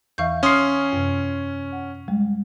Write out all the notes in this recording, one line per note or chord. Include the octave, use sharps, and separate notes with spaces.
E2 E3 E5 F5 C#6 G6
C#4 C6 D#6 F6 C7
F#2 C3
F#5
G3 G#3